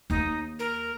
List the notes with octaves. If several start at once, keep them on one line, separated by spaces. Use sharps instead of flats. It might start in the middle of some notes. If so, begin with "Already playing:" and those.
D#2 A#3 D#4
A#4